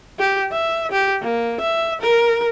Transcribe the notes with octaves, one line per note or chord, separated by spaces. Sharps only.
G4
E5
G4
A#3
E5
A#4